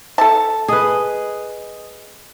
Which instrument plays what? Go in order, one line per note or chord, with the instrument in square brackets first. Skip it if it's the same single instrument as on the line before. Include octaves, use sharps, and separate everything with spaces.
[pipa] A4 E5 A5
[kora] G#4 B4 [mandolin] D#5